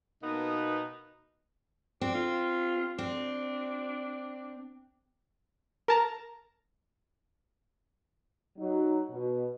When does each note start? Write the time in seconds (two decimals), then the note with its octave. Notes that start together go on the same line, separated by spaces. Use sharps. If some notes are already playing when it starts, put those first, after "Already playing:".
0.22 B2 A#3 B3 D#4
2.01 C4 D4
2.15 F4
2.98 C4 D4
5.88 A#4 A5 A#5
8.58 F#3 D#4
9.10 B2